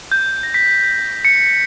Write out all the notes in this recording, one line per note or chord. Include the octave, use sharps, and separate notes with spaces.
G6
A#6
B6
C#7